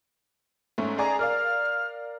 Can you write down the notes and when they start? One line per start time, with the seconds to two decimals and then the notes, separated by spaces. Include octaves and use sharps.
0.78 G#2 A3 C#4
0.98 G#4 D5 G#5 A#5
1.19 A#4 D5 F5 F6